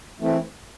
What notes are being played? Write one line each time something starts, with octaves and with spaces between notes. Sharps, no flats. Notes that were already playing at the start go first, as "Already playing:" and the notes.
E3 A3 C4 E4